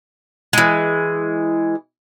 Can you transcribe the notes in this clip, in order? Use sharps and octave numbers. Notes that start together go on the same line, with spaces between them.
E3 G#3